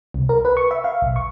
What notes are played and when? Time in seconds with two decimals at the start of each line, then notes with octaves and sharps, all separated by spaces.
0.14 C2
0.29 A#4
0.45 B4
0.57 C#6
0.71 E5
0.84 F5
1.02 B1
1.16 C#6